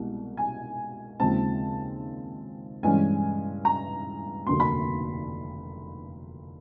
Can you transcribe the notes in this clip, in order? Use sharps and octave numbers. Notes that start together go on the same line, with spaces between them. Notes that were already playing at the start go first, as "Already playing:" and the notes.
Already playing: C2 B2 G#3
G#5
D#2 C#3 F3 G#3 C4 A5
G2 E3 G#3 C#4 G#5
A#5
F1 D#2 D3 F#3 A#3 C6
B5